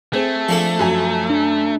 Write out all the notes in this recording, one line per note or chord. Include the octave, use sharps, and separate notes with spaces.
A3 C4 G#4
F3 D4 A4
F#2 F#3 G#5
D4